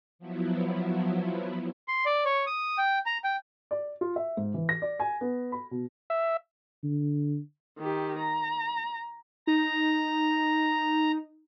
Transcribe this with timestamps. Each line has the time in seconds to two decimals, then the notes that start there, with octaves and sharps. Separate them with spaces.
0.19 F3 F#3 B3 E4
1.88 C6
2.06 D5
2.25 C#5
2.47 D#6
2.78 G5
3.06 A#5
3.24 G5
3.71 D5
4.01 F4
4.16 E5
4.37 G#2
4.54 E3
4.69 A#6
4.82 D5
4.99 G#5
5.21 B3
5.52 B5
5.71 B2
6.10 E5
6.83 D3
7.78 D#3 G4
8.20 A#5
9.47 D#4 A#5